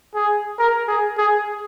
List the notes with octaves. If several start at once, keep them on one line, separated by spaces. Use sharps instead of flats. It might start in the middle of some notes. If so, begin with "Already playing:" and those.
G#4
A#4
G#4
G#4